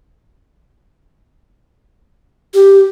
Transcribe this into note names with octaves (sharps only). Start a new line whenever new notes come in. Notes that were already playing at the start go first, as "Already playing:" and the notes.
G4